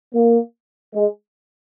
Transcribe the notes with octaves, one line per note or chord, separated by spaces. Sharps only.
A#3
G#3